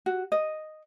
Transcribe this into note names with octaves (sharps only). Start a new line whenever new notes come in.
F#4
D#5